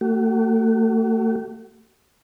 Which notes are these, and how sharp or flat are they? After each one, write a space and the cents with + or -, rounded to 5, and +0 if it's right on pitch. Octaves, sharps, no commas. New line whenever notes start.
A3 +35 F#4 +40